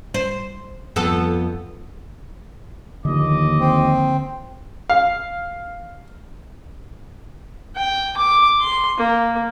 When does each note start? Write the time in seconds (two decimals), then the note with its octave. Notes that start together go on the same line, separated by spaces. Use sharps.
0.14 C5
0.96 F2 B3 A4
3.05 D#2 D3 F3 A#3 D#5 D6
3.60 C4
4.90 F5
7.75 G5
8.17 D6
8.60 C6
8.98 A#3